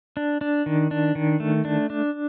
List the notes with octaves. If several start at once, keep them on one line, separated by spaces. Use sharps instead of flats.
D4
D4
D#3
D4
D#3
A3
D4
D4